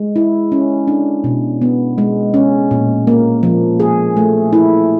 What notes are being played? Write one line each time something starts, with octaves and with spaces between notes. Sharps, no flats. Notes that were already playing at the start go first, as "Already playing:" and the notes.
Already playing: G#3
E4
C#4
D4
B2
B3
G#3
C#4
A#2
A#3
F3
G#4
A3
E4